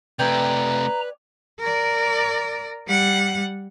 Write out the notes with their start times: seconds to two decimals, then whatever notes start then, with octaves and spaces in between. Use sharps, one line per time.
0.19 C3 A3 B4 D5 G5 G#5 A#5
1.59 A#4 D5
2.87 G3 F#5